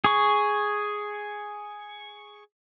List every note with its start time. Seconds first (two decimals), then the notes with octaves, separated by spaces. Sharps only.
0.04 G#4 C#6